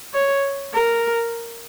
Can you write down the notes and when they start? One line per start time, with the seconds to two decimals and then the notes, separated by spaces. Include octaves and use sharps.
0.14 C#5
0.74 A#4